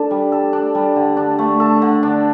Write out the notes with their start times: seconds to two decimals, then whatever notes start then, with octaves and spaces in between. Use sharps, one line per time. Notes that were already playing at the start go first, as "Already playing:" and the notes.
Already playing: D4 A4
0.11 G3
0.32 A4
0.53 D4
0.75 G3
0.96 D3
1.17 D4
1.39 A3
1.60 A4
1.82 D3
2.03 D4